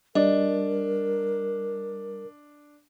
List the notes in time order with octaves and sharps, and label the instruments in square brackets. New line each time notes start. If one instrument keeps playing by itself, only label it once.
[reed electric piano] G3 [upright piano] D4 [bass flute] A#4 [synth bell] D#5